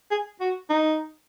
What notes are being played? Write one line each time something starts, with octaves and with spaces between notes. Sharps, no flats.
G#4
F#4
D#4